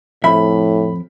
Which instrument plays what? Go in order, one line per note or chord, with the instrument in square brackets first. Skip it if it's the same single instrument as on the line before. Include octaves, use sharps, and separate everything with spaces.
[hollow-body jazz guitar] F2 E5 [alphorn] A2 [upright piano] B5